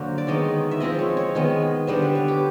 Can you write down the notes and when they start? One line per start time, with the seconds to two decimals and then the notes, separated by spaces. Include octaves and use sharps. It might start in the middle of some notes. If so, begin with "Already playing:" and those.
Already playing: D3 F#3 A#3 C5
0.18 D5
0.27 D#3 G#3 B3 D#4 C#5
0.71 E5
0.80 F3 G#3 C4 D#5
0.99 C#5
1.17 C#5
1.35 D#3 G#3 B3
1.87 D3 G3 B3 D4 C5
2.02 B4
2.15 C#5
2.28 G4